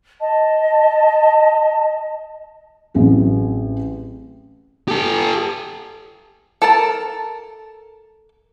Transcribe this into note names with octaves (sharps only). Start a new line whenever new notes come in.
D#5 A5
A1 F#3 C4 G#4
G4 A4
A4 A#4 A5